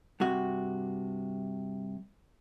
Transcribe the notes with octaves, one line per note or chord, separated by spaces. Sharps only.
G2 C3 F#4